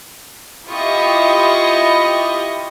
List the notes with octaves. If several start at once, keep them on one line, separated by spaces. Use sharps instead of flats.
E4 F4 G4 D#5 C#6 D#6